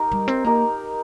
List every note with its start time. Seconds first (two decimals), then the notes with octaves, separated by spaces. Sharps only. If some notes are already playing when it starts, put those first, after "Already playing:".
Already playing: D#4 G4 A#4
0.12 G3
0.28 C4
0.45 A#3 D#4 G4 A#4